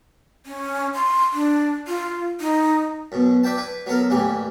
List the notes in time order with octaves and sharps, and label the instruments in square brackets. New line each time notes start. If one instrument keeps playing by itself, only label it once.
[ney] C#4
C6
D4
F4
D#4
[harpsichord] F#2 B2
B4 D5 E5 G5 A5
E4 B4
F#3 B3 A4 A#4
A1 D#2 E3 G3 G#5